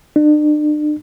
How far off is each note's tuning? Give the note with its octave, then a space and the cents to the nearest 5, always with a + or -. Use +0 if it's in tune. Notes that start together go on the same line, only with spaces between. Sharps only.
D4 +40